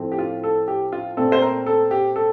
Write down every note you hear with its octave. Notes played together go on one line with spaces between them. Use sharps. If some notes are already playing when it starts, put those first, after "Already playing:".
Already playing: A2 F3 C4
G4
F4
A4
G4
F4
A#2 A3 C4 A4
C5
A#4
A4
G4
A4